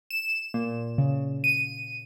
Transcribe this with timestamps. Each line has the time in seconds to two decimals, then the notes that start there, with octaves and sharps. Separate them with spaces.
0.10 E7
0.54 A#2
0.98 C#3
1.44 D#7